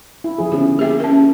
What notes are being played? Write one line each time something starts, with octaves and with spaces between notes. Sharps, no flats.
E4
F3 E4 G#4
D3 B3 C#4 G4
A#3 G4 G#4 E5
C#4 A#4